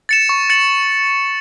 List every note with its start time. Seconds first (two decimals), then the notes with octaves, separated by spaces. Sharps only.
0.09 A6 C#7 E7
0.29 C#6
0.50 A6 C#7 F#7